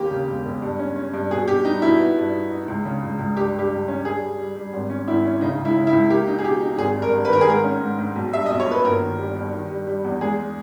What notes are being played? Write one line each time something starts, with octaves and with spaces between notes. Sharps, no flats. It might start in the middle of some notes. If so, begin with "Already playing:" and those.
Already playing: D#2 A#3 G4
C#3
E1
E1
G2
C#4
C#4
G2
B2 G#4
B2 G4
G3 D#4
B2 E4
B3
G2
D#4
D#4
C#2
C#3
C#2
C#2
G2 G4
G2 G4
G2
C#4
G2 G#4
G3
G3
G3
G#1
C#4
G#1 E4
C#4
C#3 D#4
C#2
E4
C#3
E4
C#2
A#3 G4
D#4
G#4
B2 G4
D#4
G#1 G#4
G2
A#4
G2
B4
D#3 A#4
G#4
G#2 A#4
C#4
G#2
G#2
B1
G3 E5
B1 D#5
C#5
A#2 B4
G1 A#4
D#3
G3
G2
D#3
G3
G3
E2
G#3 G#4
G#3